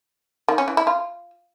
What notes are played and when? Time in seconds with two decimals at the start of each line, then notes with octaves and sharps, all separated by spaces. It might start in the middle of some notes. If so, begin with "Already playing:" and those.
0.48 D#3
0.58 C#4
0.68 E3
0.77 E4
0.87 F4